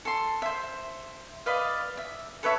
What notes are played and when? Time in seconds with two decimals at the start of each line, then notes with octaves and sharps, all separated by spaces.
0.05 A4 C6
0.42 C5 E5
1.46 B4 D5 D#5 F5
1.97 E5
2.43 A4 B4 C#5 E5